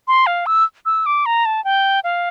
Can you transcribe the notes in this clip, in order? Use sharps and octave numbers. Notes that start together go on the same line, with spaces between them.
C6
F5
E6
E6
D6
A#5
A5
G5
F5